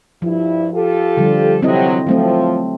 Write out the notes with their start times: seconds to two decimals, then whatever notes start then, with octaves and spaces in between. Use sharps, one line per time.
0.22 G2 F3 E4
0.74 F4 G4 A4
1.17 D3 F3 G3
1.62 C3 F#3 C4 E4 D#5
2.07 F3 F#3 A3 C4